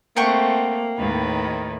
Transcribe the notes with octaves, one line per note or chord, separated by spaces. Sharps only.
A3 A#3 C4 F#5 G5 C#6
D#2 A2 D#3 B4